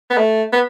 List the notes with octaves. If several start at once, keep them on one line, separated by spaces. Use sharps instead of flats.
B3
A3
B3